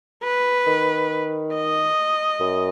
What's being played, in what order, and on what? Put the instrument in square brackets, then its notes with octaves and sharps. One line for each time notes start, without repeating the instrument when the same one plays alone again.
[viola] B4
[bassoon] D#3
[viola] D#5
[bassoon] F#2